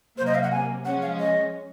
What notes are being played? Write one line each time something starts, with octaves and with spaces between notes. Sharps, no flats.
C3 F#3 A#3 C5
D#5
F5
F#5
G#5
F3 G#3 C#4 F#5
F5
D#5